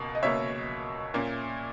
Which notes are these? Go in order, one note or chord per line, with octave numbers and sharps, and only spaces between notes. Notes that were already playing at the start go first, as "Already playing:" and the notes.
Already playing: C#2 B2 A#3
D#5
C#2 B2 A#3 C#5 E5
A#2 A#3 C#4